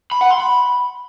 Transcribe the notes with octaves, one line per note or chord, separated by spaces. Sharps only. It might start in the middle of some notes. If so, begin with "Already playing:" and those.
B5
F#5
C6
B5